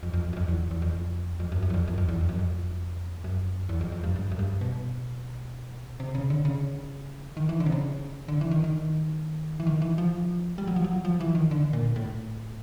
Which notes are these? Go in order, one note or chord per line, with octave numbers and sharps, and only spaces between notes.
F2
F2
F#2
F2
E2
E2
F2
F2
F#2
F#2
E2
F2
F#2
F2
E2
F2
F#2
F2
F#2
E2
F2
F2
G2
G2
F#2
G2
B2
C3
C#3
D3
C#3
D#3
E3
D3
C3
C#3
D3
E3
D#3
D#3
E3
D#3
E3
F3
G3
F#3
F3
F#3
F3
E3
D#3
D3
A#2
A2